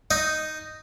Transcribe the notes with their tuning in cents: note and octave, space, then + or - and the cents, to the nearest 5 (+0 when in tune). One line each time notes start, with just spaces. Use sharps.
D#4 +0 D#5 -10